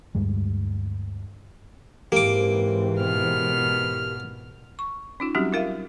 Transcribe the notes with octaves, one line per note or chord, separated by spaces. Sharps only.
D2 G2 G3 G#3
G#2 E3 A#3 C4 G4 A#4 D6
B2 F6
C#6
C#4 D#4 F4
F#3 G3 C4 C#4 F#4 G4
E4 F4 A#4 E5 F5